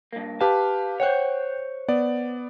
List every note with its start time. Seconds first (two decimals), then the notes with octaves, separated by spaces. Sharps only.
0.13 G2 A#3
0.41 G4 B4 F5 A5
1.00 C5 C#5 F#5 G5 F#6
1.88 B3 D5